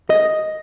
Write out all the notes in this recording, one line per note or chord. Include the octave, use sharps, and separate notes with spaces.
D#5